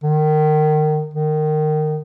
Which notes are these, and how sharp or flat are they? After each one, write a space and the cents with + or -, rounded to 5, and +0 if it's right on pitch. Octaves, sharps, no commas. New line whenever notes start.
D#3 -25
D#3 -20